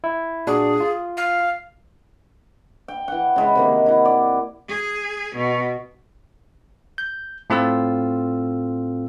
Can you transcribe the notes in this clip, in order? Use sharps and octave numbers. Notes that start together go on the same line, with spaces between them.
E4
A#2 D4 F#4 G#4
F4
F5
G5
E3 F#5
C#3 G#3 B5
C3 D#3 A#3
E4 F#5
D5
G#4
B2
G6
A2 C4 F4 A4 E6